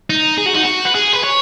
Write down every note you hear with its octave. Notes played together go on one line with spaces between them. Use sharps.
D#4
G#4
F#4
D#4
F#4
B4
G#4
B4
C#5